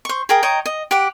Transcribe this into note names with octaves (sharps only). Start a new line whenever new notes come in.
C5 C#6
G#4 A#4 G5 D#6
C#5 D#5 G5 A#5
D#5
G4 F#5 D6